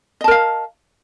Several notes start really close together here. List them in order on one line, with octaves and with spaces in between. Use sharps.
D#5 A5 A#4 F5